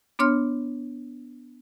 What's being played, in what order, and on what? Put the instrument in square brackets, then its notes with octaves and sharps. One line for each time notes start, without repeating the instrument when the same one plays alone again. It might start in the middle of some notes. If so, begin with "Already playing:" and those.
[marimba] B3 D4 C#5 C6 F6